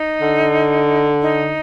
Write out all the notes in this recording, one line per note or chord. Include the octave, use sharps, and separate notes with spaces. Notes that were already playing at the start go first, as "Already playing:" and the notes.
Already playing: D#4
D3
D#4